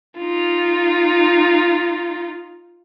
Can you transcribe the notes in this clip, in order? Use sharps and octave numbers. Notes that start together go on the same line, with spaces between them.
D#4 F4